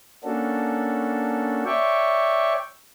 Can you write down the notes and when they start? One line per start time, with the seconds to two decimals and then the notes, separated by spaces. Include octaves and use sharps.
0.24 A#3 C#4 D4 F#4 A4
1.66 C#5 D5 E5 G5 C#6